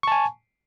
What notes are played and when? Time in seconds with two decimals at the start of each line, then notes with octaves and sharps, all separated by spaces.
0.03 C#6
0.08 A5
0.12 G#5